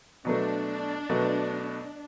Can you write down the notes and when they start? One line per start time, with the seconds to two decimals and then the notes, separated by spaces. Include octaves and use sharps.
0.25 B2 F#3 A3 D4
1.09 B2 F#3 A3